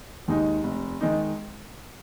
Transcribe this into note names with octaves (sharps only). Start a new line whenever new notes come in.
D#2 D#3 G#3 D#4
F1
D#3 G#3 D#4